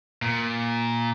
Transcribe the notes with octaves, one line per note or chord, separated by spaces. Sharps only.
A#2